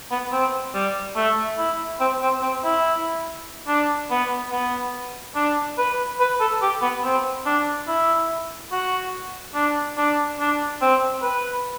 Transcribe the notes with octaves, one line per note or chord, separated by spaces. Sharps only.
B3
C4
G3
A3
E4
C4
C4
C4
E4
D4
B3
B3
D4
B4
B4
A4
G4
B3
C4
D4
E4
F#4
D4
D4
D4
C4
B4